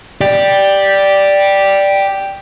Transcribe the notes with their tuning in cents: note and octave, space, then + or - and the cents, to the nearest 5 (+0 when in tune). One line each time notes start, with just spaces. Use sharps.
G4 +0 D5 +0